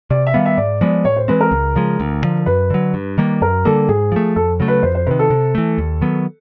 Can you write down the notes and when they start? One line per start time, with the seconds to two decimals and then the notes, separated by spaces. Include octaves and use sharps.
0.10 C3 D5
0.27 E5
0.34 D#3 G3 B3 F5
0.46 E5
0.57 G#2 D5
0.81 F3 G#3 B3 D5
1.05 A2 C#5
1.16 C5
1.28 E3 G#3 C4 B4
1.41 A#4
1.51 C#2
1.75 C#3 F3 G#3
2.00 D2
2.22 D3 F3
2.46 F#2 B4
2.70 D3 F#3
2.94 G2
3.18 D#3 G3 A#3
3.42 F#2 A#4
3.65 D3 G3 A#3 A4
3.89 G#2 G#4
4.12 F3 A3
4.36 F2 A4
4.60 C#3 F#3 A3
4.68 B4
4.83 F2 C5
4.95 C5
5.06 C3 D#3 B4
5.19 A4
5.30 C3
5.55 E3 A3
5.78 D#2
6.01 D#3 F#3 B3